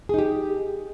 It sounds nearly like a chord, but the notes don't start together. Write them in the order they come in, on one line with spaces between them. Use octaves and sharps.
G#4 D#4 G4